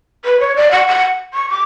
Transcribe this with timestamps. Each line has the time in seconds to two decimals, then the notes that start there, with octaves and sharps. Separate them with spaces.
0.25 B4
0.40 C#5
0.56 D5
0.71 F#5
0.88 F#5
1.34 C#6
1.49 D6